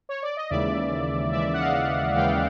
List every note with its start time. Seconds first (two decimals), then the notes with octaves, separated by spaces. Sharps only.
0.09 C#5
0.23 D5
0.37 D#5
0.50 D#2 C#3 E3 G#3 D5 E5
1.33 D#2 C#3 E3 G#3 D5 E5
1.54 F#5
1.60 D#5 F5
2.16 D#2 C#3 E3 G#3 F5 G5